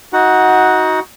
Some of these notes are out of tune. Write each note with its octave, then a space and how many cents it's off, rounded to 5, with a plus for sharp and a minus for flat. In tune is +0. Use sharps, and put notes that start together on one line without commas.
D#4 +25 F#4 +0 F#5 +0